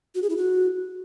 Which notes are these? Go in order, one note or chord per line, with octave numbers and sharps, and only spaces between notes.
F#4
G#4
E4
F#4